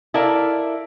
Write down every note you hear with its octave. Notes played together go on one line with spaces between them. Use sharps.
E4 A4 A#4 D5 E5 F5